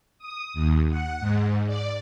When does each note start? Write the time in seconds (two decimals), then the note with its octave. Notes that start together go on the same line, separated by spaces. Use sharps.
0.18 D#6
0.54 D#2
0.89 F#5
1.20 G#2
1.66 D5